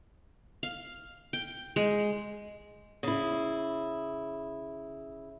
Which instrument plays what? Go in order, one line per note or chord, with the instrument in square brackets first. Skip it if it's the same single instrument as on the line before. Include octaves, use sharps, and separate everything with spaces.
[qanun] F5
G5
G#3
[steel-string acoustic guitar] C#3 E4